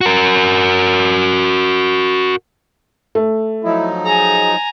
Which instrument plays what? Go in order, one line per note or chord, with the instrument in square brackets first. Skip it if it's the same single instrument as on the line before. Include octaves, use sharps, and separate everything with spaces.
[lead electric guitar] F#4 A#4
[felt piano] A3
[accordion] F3 F#3 D#4 [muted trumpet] E4
[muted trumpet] G#4 [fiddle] G#5 A#5